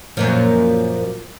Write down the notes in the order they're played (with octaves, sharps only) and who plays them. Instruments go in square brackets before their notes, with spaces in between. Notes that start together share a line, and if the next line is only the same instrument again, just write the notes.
[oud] F#2 A#2 F3